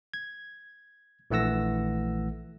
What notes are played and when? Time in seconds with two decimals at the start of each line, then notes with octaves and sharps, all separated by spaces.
0.14 G#6
1.30 A#1 E3 A3 F#5 E6 A#6